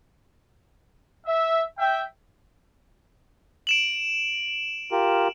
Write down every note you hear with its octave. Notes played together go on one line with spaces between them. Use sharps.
E5
E5 G5
D7 E7 F#7
F4 G4 A#4